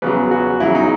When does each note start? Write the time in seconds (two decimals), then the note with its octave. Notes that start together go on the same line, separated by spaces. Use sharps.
0.02 E2 C#3 F#3 B4
0.31 F#4
0.60 E2 C#3 F#3 E4
0.75 D#4